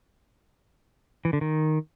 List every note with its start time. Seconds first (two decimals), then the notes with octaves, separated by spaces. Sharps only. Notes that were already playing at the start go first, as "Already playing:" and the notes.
1.25 E3
1.33 D3
1.41 D#3